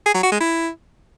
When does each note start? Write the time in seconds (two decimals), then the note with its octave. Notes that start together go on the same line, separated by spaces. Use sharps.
0.06 G#4
0.14 F#3
0.23 F#4
0.32 G#3
0.41 E4